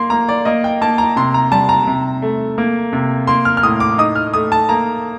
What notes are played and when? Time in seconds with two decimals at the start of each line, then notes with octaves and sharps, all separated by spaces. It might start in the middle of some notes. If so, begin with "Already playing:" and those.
Already playing: A#3 C6
0.10 A#3 A#5
0.29 D5
0.45 A#3 D#5
0.64 G5
0.81 A#3 A5
0.98 A#5
1.16 C3 C6
1.34 A#5
1.52 G3 A5
1.69 A#5
1.87 C3
2.22 A3
2.58 A#3
2.93 C3
3.27 A#3 C6
3.45 F6
3.57 F6
3.63 A2 D#6
3.80 D6
3.98 D#4 D#6
4.15 F6
4.34 A3 D#6
4.52 A5
4.69 A#3 A#5